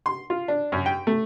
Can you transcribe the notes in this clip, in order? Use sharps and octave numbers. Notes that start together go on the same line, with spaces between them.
C6
F4
D4
F#2
G5
A3